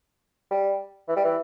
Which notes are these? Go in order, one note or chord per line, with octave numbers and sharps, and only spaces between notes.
G3
E3
G3
E3